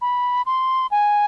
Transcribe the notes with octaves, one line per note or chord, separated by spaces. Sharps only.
B5
C6
G#5